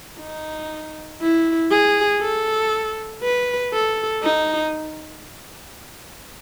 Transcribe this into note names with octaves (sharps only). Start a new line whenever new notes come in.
D#4
E4
G#4
A4
B4
A4
D#4